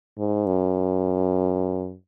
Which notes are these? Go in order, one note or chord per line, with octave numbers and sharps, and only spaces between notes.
G#2
F#2